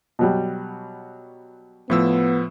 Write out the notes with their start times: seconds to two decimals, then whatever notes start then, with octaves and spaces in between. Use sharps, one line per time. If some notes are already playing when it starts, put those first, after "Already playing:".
0.19 B2 F#3 G3
1.90 A2 F3 B3 E6